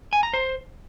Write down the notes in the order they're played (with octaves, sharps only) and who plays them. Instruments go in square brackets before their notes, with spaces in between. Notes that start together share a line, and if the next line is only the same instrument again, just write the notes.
[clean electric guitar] G#5
A#5
C5